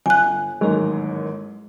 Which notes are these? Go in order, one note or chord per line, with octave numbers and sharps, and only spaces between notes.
G1 G#5 F#6
A1 D#2 G#2 F#3 G#3 A#4